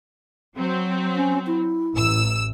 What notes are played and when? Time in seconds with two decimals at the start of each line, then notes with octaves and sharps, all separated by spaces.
0.56 F#3 C4
1.16 C#4
1.47 E4
1.95 A1 E6